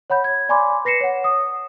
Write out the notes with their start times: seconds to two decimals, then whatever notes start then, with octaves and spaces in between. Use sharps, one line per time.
0.10 C#5 F#5 B5 G6
0.24 G#6
0.49 D5 G#5 B5 C6 D6
0.85 B4 A#6 C7 C#7 E7
1.01 C#5 F#5
1.24 D#6